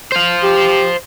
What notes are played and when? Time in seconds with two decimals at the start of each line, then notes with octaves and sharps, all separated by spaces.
0.12 C5 F5
0.43 G4